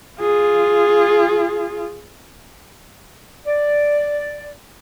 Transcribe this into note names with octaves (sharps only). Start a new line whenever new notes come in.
F4 G#4
D5